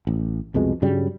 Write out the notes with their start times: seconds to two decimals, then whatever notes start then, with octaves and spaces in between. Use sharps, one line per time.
0.07 A1
0.54 C2 F2 B2 G#3
0.82 G2 C#3 F#3 G3